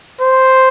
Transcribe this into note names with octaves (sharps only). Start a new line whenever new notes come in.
C5